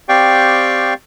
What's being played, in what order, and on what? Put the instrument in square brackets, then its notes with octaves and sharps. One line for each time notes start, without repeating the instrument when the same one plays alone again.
[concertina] C4 G4 D5 F5 G5 C#6